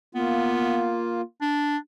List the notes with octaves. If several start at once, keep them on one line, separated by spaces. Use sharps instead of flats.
A#3 B3 F4
D4